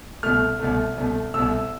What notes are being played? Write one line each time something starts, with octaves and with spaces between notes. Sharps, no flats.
C2 B2 A3 F6
C2 B2 A3
C2 B2 A3
C2 B2 A3 E6